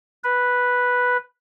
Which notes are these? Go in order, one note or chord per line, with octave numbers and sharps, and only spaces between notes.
B4